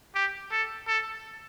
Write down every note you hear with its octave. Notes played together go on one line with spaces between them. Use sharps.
G4
A4
A4